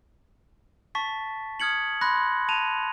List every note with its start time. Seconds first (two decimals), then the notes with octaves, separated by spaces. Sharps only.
0.95 A5 C#6 A6 B6
1.60 D#6 F6 G#6 C#7 F#7
2.01 B5 C6 F#6 A#6
2.49 A5 D#7 F7